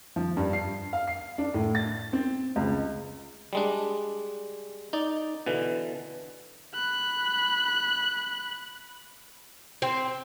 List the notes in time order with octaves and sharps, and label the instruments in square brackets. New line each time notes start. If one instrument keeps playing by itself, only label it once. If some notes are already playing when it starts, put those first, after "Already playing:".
[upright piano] F3
G2
C7
F5
C7
D4
A2
A6
C4
C#2
[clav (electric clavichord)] G3 G#3 D4
D#4 D5
B2 D3 E3
[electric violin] B5 F#6
[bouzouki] C4